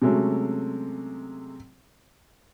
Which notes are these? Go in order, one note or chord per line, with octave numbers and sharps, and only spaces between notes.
C3 F#3 G#3 A3 C#4